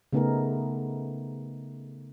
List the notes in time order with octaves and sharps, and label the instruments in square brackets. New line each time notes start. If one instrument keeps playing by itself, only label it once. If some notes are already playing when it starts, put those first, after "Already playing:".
[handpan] C#3 A3 B3 D#4 G#4 A#4